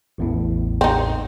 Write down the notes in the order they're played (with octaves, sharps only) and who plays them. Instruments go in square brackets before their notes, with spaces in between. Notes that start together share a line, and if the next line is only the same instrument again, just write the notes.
[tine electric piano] A1 E2 A2
[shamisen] C4 D#4